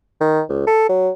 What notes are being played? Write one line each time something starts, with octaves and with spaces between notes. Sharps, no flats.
D#3
C#2
A4
F#3